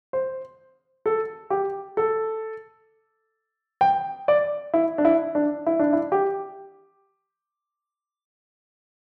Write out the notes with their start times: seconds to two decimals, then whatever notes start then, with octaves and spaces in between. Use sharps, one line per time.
0.13 C5
1.06 A4
1.50 G4
1.97 A4
3.81 G5
4.28 D5
4.74 E4
4.98 D4
5.05 E4
5.35 D4
5.66 E4
5.79 D4
5.93 E4
6.12 G4